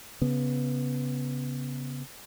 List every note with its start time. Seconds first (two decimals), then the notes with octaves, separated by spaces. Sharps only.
0.21 C#3 B3